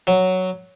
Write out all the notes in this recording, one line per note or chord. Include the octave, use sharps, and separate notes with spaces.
F#3